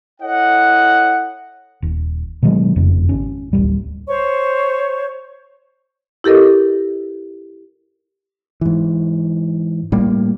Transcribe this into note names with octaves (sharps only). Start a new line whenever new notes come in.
E4 A4 C#5 D#5 F#5
D#1
B2 D#3 F#3 G#3
F#1 F2 C#3
G#1 C#4
D1 B1 G3
C5 C#5 C#6
E4 G4 A4 A#4 D#5
G#2 E3
A2 G3 A#3